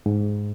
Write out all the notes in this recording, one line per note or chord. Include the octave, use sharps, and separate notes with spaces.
G#2